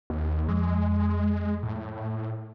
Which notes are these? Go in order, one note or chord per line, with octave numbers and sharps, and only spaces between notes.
D#2
F2 G#3
A2